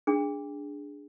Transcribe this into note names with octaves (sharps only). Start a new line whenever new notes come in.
D4 G#4